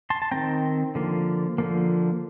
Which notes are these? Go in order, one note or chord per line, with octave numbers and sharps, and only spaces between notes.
A5 C6
A5
D#3 A3 C4 G5 A#5
D3 F3 A#3
D3 F3 A#3